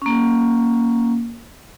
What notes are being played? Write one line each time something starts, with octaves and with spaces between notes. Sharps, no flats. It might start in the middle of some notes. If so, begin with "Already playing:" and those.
A#3 C#4